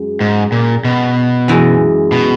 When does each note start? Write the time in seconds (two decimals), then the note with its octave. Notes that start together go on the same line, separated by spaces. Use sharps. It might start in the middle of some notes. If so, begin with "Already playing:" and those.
Already playing: F#2 G#3
0.21 G#2
0.52 A#2
0.85 B2
1.48 F#2 E3 G#3
2.12 B2